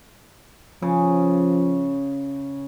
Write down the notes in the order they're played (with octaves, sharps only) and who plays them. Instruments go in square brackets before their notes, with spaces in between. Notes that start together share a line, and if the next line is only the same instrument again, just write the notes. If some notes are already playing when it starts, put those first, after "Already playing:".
[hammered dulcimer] C#3 [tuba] F3